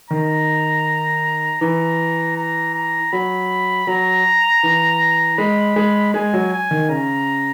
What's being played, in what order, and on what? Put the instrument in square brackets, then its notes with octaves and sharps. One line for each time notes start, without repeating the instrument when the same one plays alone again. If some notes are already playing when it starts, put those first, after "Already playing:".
[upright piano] D#3 [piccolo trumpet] A#5
[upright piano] E3 [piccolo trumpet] A#5
[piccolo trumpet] A#5
A#5
[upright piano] F#3 [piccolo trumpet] B5
[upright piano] F#3 [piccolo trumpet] A#5
[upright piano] E3
[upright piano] G#3 [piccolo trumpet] B5
[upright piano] G#3
[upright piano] G#3 [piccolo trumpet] G#5
[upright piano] F#3
[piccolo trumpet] G#5
[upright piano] D#3
[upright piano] C#3 [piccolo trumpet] A#5